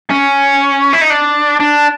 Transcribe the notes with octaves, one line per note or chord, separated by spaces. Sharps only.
C#4
E4
D#4
D4
D4